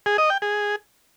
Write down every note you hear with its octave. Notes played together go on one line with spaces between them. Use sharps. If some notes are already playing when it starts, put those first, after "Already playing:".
G#4
D#5
G5
G#4